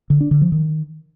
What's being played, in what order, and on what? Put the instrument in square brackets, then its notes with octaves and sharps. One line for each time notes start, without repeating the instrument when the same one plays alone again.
[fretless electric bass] D3
D4
D3
F3
D#3